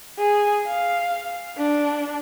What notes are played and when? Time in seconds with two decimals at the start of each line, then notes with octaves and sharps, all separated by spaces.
0.19 G#4
0.68 F5
1.58 D4